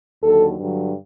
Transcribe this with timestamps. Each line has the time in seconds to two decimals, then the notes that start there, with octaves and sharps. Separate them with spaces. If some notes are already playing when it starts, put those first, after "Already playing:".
0.23 D#2 D3 F#3 A4
0.59 G2 D3 F#3